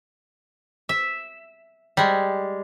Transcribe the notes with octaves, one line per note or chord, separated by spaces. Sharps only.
E5
G3 G#3